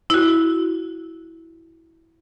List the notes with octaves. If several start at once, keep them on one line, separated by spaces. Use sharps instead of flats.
E4 F#4